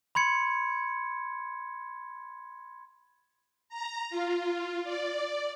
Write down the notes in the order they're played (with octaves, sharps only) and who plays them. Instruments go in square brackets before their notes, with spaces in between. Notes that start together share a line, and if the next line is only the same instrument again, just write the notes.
[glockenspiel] B5 C6 G#6 C#7
[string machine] A#5
F4
D5